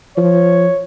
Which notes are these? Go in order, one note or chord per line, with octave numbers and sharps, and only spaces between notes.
F3 C#5